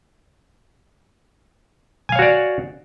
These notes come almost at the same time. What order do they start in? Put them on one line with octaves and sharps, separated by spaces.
G#5 F5 C#5 F#4 D5